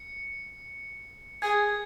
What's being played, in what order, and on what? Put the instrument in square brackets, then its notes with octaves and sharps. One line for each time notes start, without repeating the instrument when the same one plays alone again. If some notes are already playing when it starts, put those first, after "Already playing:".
Already playing: [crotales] C#7
[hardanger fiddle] G#4 [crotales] G#6